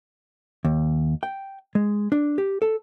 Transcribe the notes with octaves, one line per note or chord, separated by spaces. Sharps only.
D#2
G5
G#3
D4
G4
A4